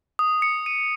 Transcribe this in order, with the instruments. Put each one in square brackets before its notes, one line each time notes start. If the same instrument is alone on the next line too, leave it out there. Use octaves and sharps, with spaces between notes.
[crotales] D#6
C#7
D#7